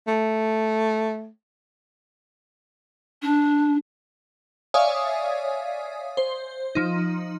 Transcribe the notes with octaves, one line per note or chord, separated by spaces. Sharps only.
A3
D4
C#5 D5 E5 F5 G#5 D#6
C5
F3 D#4